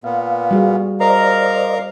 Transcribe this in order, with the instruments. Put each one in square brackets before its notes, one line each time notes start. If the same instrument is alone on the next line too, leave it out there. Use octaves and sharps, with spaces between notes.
[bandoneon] A#2 B3 [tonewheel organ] F5
[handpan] G3 F#4 G#4
[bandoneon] A#4 F5 A#5 [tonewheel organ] C5 D5 D#5